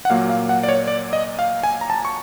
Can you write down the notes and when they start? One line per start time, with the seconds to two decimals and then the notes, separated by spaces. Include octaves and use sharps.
0.05 F#5
0.10 A#2 F#3 A#3 F5
0.30 F5
0.49 F#5
0.63 D5
0.69 C#5
0.88 D5
1.13 D#5
1.39 F5
1.64 G#5
1.81 A#5
1.90 A5
2.05 C#6